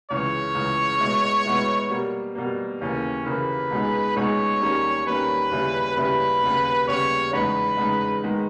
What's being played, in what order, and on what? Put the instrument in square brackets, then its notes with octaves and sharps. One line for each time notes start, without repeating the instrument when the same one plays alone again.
[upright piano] C#2 C#3 E3 [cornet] C#5
[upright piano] C#2 C#3 E3
B2 G#3 B3 E4
B2 G#3 B3 E4
B2 G3 A#3
B2 G3 A#3
[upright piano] D#2 C#3 E3 A#3 [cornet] C#4
[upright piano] D#2 C#3 E3 A#3 [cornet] B4
[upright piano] C#2 B2 G#3 D#4 G#4
[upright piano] C#2 B2 G#3 D#4 G#4 [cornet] C#5
[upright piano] D#2 D#3 G3 A#3 C#4
[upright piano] D#2 D#3 G3 A#3 C#4 [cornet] B4
[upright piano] D#2 C#3 G3 C#4 E4
[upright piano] D#2 C#3 G3 C#4 E4 [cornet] B4
[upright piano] D#2 C#3 G3 B3
[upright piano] D#2 C#3 G3 B3 [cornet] C#5
[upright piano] E2 C#3 G#3 D#4 [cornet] B4
[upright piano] E2 C#3 G#3 D#4
D#3 G#3 B3